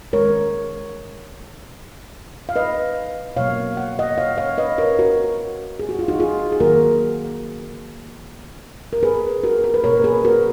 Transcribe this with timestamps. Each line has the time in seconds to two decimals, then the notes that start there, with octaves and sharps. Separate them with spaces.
0.13 D#3 G#3 A#4 C#5
2.49 F5
2.56 B4 D#5
3.36 B2 F#3 A#3 C#5 F5
3.77 F#5
3.99 D#5 F#5
4.18 C#5 F5
4.38 C#5 F5
4.58 B4 D#5
4.78 A#4 C#5
4.99 F#4 A#4
5.79 G#4
5.89 F#4
5.99 F4
6.08 D#4 F#4
6.20 F4 G#4
6.52 G#4
6.60 D#3 F#3 A#3 F#4 A#4
8.93 A#4
9.03 G#4 B4
9.43 F#4 A#4
9.64 A#4
9.74 B4
9.84 B2 A#3 A#4 C#5
10.04 G#4 B4
10.24 F#4 A#4